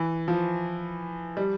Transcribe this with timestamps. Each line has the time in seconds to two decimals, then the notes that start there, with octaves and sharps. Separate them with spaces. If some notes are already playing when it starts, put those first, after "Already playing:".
Already playing: E3
0.28 F3
1.37 G3